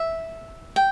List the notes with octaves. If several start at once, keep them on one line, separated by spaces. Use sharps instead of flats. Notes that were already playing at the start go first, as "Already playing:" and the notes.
Already playing: E5
G5